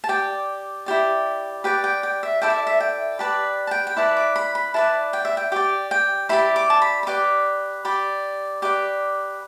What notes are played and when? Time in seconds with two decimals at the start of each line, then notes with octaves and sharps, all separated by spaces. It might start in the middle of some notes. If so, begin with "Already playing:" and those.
0.04 A5
0.09 G4 D5 G5
0.86 E4 G4 D5
1.64 G4 B4 D5 G5
1.84 G5
2.03 G5
2.23 E5
2.42 E4 A4 D5 G5
2.50 E5
2.67 E5
2.80 G5
3.19 G4 B4 D5 A5
3.67 A5
3.71 G5
3.87 G5
3.97 E4 B4 D5 A5
4.17 D6
4.36 B5
4.55 B5
4.74 E4 B4 D5 A5
5.13 G5
5.25 E5
5.37 G5
5.52 G4 D5 G5
5.91 G5
6.29 E4 G4 D5 B5
6.56 D6
6.70 A5
6.82 B5
7.03 B5
7.07 G4 B4 D5 D6
7.85 G4 D5 B5
8.62 G4 B4 D5 D6